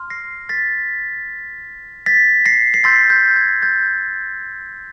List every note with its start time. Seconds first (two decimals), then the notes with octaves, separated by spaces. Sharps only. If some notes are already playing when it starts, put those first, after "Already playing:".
Already playing: C6 F6
0.10 A#6 C7
0.49 A6 B6
2.06 A6 B6
2.46 A#6 C7
2.74 C7
2.84 C6 E6 G6 A6 B6
3.10 G6
3.36 G#6
3.62 G6 A6